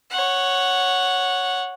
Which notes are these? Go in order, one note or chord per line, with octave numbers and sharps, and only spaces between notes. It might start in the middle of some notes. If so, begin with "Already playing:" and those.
C#5 F#5